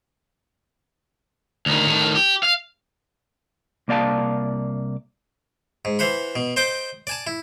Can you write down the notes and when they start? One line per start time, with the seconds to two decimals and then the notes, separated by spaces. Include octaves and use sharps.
1.66 D2 D#3
1.86 A2 D#3
2.15 G4
2.43 F5
3.88 C2 A#3 D5 F5 A5
5.85 G#2
5.99 E3 C5 F#5 B5
6.36 B2
6.56 C5 D#5 G5 D6
7.07 D5 G#5 A5
7.27 E4